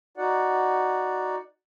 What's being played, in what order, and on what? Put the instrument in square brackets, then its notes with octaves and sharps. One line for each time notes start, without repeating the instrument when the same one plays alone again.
[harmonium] D#4 F#4 D5 F#5